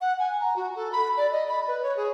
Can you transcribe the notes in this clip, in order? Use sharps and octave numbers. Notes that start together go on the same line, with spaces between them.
F#5
G#5
A#5
F#4
A4
B5
D5
D#5
B5
B4
C#5
G#4